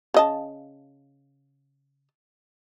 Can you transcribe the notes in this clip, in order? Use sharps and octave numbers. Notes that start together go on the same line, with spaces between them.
C#3 D#5 A5